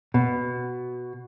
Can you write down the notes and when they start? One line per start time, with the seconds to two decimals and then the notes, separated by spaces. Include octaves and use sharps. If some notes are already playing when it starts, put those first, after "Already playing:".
0.14 B2